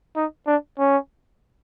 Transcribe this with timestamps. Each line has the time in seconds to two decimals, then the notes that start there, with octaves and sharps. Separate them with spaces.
0.17 D#4
0.47 D4
0.79 C#4